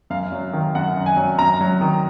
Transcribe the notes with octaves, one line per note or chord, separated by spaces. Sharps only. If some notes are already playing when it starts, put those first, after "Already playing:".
F#2 F5
F#3
D#3
F#2 F#5
F#2
G#5
F#3
F#2 A#5
F#3
D#3